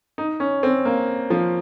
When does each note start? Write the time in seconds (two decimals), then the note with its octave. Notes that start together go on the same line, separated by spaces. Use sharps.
0.18 D#4
0.40 C#4
0.63 C4
0.85 A#3
1.30 F3